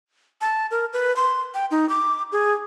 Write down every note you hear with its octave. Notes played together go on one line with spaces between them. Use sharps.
A5
A#4
B4
C6
G5
D#4
D6
G#4